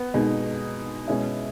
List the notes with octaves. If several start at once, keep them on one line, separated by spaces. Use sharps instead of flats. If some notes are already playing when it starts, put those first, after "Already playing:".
Already playing: B3
B2 G#3 D#4
B2 G#3 C#4 E4